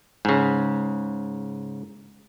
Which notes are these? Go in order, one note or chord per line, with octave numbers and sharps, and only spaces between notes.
G#2 C#3